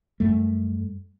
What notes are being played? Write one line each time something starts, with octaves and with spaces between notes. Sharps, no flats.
F#2 G3 A3